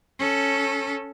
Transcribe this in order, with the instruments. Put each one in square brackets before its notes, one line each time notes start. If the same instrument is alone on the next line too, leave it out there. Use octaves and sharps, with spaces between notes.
[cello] C#4 A4